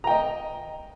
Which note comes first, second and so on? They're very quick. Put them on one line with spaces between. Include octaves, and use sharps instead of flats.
A#5 G5 D#5